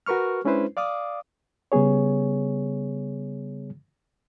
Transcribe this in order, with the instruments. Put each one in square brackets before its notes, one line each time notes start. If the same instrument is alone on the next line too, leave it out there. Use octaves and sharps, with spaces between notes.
[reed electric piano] F#4 A#4 B4 C#6 F6
G#3 C#4 D4 E4 B4 C5
D5 F5 D6 D#6
C#3 G3 B3 G#4 C#5